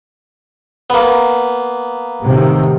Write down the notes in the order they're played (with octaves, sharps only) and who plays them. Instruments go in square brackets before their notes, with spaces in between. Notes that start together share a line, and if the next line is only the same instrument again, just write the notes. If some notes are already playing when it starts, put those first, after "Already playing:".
[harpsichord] A#3 B3
[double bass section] A2 C3 D#3